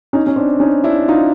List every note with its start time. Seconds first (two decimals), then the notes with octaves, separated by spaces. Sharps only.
0.13 C#4 D#4
0.27 C#4
0.36 C4 D4
0.60 C#4 D#4
0.84 D4 E4
1.08 D#4 F4